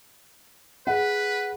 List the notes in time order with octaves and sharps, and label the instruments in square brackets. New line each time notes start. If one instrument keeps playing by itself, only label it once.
[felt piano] G#4 F#5 [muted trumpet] B4